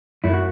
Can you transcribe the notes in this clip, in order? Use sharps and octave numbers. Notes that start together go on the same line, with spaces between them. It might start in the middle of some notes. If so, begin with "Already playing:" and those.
F#2 F#3 A3 E4
F#4